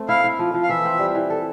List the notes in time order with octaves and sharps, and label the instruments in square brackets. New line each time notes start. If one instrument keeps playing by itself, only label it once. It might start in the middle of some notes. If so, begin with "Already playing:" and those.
Already playing: [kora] A3 C4
[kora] E4 [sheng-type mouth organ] F5
[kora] E4
F3
F3
[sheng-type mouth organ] F5
[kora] E3 [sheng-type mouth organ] E5
[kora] C4
G3
E3
A4